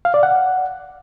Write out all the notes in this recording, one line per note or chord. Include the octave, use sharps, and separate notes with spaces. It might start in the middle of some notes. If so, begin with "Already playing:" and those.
F5
D5
F#5